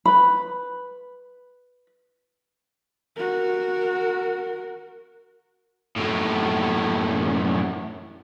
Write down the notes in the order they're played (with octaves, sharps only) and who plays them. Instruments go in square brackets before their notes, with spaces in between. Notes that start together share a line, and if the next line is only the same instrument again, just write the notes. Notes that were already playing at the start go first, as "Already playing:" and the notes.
[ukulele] B4 B5
[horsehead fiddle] F#4 A#4
[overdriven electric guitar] F#2 A2